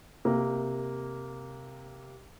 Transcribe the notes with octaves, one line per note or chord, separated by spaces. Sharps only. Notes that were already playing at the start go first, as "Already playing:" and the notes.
C3 A#3